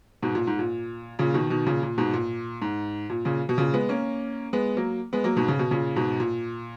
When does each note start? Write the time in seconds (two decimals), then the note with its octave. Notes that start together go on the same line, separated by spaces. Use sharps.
0.22 G#2 B2
0.35 A#2
0.47 G#2
0.59 A#2
1.19 A#2 C#3
1.34 B2 D#3
1.50 B2 D#3
1.67 A#2 C#3
1.83 A#2
1.98 G#2 B2
2.14 A#2
2.62 G#2
3.10 A#2
3.25 A#2 C#3
3.49 B2
3.58 A#2 C#3
3.74 G#3 B3
3.89 A#3 C#4
4.53 G#3 B3
4.77 F#3 A#3
5.13 G#3 B3
5.24 F#3 A#3
5.37 G#2 B2
5.48 C#3
5.59 B2
5.71 A#2 C#3
5.96 G#2 B2
6.20 A#2